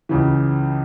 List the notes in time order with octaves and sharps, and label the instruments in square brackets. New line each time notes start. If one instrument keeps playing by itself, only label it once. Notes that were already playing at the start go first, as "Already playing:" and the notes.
[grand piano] C#2 C#3 E3